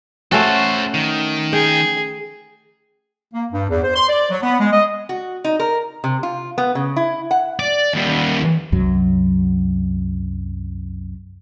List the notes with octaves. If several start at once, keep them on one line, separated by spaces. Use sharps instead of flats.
A3 C#4 F#4 A4 C5
D#3
G#4 G5
A#3
G2
E2
C5
C6
D5
F#3
B3
G#3
D#5
F#4
D#4
A#4
C3
F4
B3
C#3
E4
F#5
D5
D#2 G3
C2 F#2 F#3